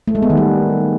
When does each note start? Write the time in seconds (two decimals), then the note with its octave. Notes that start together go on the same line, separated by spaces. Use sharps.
0.08 A3
0.15 G#3
0.22 B3
0.30 D#3
0.37 G3